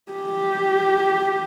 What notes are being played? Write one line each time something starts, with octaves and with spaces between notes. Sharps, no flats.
G4